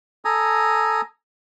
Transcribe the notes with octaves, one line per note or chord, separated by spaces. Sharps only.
A4 G#5 A#5 D#6